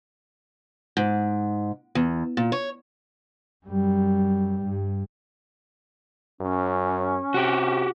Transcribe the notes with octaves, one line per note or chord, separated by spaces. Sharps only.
G#2
E2
A#2
C#5
F#2 G3
G2
F#2 C#4
C3 F#4 G4